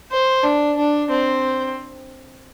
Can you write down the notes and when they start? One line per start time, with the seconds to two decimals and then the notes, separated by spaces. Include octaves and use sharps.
0.12 C5
0.43 D4
0.77 D4
1.10 C4